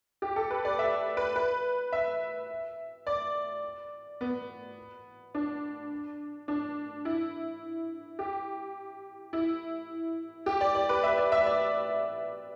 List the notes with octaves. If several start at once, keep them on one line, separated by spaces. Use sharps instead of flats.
G4
A4
B4
D5
E5
B4
B4
E5
D5
B3
D4
D4
E4
G4
E4
G4
D5
D5
B4
E5
D5
E5
D5